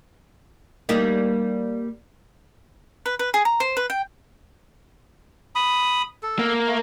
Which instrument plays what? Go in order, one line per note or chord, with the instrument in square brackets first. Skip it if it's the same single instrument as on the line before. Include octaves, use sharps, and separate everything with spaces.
[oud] G3 A#3 D#4
[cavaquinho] B4
B4
G#4
A#5
C5
B4
G5
[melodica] B5 D#6
A4
[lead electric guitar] A#3
[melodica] A3